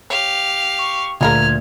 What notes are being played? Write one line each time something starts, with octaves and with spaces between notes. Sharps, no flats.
G4 C#5 F5
C#6
D2 A#2 G#3 F4 A#4 F6 G#6